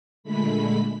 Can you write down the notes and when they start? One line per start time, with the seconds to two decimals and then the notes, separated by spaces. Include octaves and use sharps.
0.23 A#2 D3 G#3 A3 B5 B6